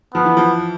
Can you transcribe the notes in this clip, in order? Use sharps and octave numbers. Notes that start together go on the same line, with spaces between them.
F3 B3
E3
F3